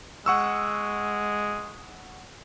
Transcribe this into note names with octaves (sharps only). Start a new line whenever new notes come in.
G#3 F#5 C#6 E6